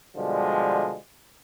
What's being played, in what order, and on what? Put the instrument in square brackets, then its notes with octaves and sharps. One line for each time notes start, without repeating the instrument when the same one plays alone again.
[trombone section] B2 D3 F3 G3 G#3